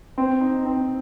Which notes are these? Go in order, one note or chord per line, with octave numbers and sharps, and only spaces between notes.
C4
D#4
C4